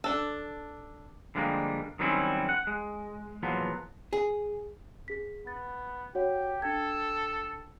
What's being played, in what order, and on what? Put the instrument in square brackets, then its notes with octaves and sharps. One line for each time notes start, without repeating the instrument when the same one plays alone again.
[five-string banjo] D4 A4
[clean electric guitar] D3 F3 G3 G#3 A#3
D#3 F#3 G3 C4 C#4 E4
F#5
G#3
E2 A#2 F3 F#3 B3
[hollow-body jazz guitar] G#4
[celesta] G#4 B6
[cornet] B3 [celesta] A6
[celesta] F#4 C#5 F#5 [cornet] G4
[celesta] D4 G5 G#6 [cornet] A4